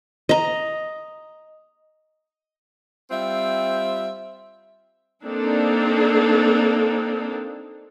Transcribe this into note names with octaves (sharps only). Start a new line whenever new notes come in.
D#5 A#5
G3 C4 F4 E5
A#3 C4 D4 D#4 A4